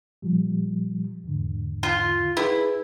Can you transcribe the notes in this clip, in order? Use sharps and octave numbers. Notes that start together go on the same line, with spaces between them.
A#2 F3 G3
E2 G#2 D3
F4
E4 G#4 B4 E6